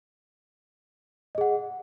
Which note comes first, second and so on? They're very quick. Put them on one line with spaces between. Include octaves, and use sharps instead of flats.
D#5 G#4 F#5